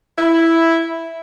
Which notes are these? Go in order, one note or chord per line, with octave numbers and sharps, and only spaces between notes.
E4